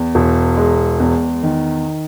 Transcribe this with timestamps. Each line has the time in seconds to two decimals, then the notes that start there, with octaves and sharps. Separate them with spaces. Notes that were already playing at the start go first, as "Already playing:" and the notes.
Already playing: E2
0.15 E1
0.57 G#3
1.00 E2
1.43 D#3